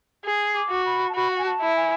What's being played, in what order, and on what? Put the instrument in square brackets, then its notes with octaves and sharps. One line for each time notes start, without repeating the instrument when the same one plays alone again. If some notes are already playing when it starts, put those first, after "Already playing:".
[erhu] G#4
[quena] D6
[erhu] F#4
[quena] B5
A5
[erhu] F#4 [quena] B5
[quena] F#5
G#5
A5
[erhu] E4
[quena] G#5